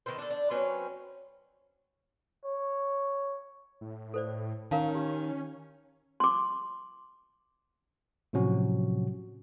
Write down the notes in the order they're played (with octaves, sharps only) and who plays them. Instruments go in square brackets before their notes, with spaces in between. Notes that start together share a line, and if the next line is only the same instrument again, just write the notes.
[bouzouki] D#3 A4 B4 C5
D4 A4
D4
F#3 C4 C#4 B4
[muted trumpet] C#5
[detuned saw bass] A2
[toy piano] A4 C5 D5
[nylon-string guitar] D#3 [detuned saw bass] C#4 [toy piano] A#4 F5 A5
[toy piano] G4
C6 D6
[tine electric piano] A2 C3 F3 F#3 C#4 F#4